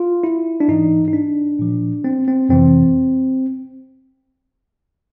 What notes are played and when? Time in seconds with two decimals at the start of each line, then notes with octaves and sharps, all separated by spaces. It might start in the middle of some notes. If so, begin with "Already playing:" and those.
Already playing: F4
0.24 E4
0.60 D4
0.68 G#2 E3 D#4
1.08 D#4
1.13 D4
1.59 A#2 F3
2.04 C4
2.28 C4
2.49 F2 C3 E3 C4